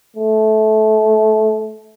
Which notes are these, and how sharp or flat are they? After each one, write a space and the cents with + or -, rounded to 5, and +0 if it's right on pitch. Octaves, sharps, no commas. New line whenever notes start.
A3 -20